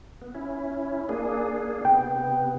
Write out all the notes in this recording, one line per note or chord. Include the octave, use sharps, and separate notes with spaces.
B3
C#4 E4
A#3 D4 G#4
C3 B3 G5